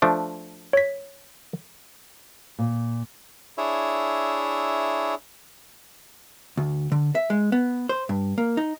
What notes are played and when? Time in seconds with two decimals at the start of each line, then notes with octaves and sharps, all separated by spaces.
0.02 F3 A3 D4
0.73 C#5 B6
2.59 A#2
3.58 D4 E4 G#4 C#5 E5
6.57 D2
6.92 D3
7.15 E5
7.30 G#3
7.52 B3
7.89 C5
8.09 G2
8.38 A#3
8.57 D#4